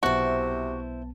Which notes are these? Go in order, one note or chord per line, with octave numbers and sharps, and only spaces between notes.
B1 C3 B3 E4 F#4 C5 A5